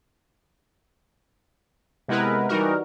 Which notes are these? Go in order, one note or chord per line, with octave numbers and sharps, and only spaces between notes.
C3 G#3 B3 E4 A#4 B4
E3 G3 D#4 F#4 A#4